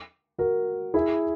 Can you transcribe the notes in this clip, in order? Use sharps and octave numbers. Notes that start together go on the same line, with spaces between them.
F#4 A#4
E4 G#4